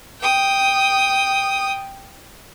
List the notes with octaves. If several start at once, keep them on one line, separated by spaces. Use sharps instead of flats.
G5 D#6